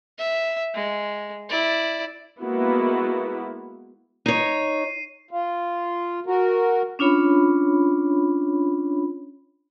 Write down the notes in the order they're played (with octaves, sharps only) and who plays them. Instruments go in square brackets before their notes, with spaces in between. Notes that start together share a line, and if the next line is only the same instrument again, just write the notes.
[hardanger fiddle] E5
G#3
E4 D5
[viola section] G#3 A#3 B3 E4 F#4
[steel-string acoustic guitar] D#4 C#5 [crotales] C7 D#7
[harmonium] F4
F#4 A#4
[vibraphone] C#4 D4 F4 C#5 B5